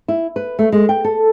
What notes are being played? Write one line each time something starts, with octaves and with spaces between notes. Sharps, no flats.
E4
B4
A3
G#3
G5
A4